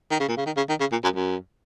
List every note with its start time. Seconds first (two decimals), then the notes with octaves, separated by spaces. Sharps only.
0.11 D#3
0.20 C#3
0.29 A#2
0.37 C#3
0.46 D#3
0.57 C#3
0.69 D#3
0.80 C#3
0.92 A#2
1.04 F#2
1.15 F#2